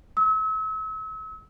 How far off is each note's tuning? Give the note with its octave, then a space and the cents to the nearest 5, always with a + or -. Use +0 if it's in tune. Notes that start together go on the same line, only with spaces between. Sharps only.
E6 -40